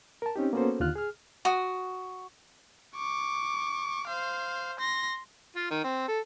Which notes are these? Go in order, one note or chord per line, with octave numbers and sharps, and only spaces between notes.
A#4 A5
C4 C#4 D#4 G4
A#3 B3 C#4 F#4 A4 C5
D#2 D3 F4 F6 F#6
G#4 F6
F#4 D#6
C#6 D6
C5 F5
C6 A#6
F4
D#3
C4
A4